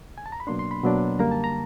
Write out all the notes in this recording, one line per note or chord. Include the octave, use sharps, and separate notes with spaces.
G#5
A5
A#5
B5
B2 F#3 A#3 D4 C6
C6
B5
B2 F#3 A#3 D4
F#2 D3 G3 A#3 A#5
A5
A#5